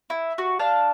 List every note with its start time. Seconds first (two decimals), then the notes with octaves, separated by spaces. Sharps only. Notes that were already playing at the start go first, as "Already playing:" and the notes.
0.10 E4
0.38 F#4
0.59 D4 F5 A5